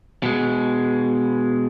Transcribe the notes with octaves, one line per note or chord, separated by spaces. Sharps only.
B2 G#3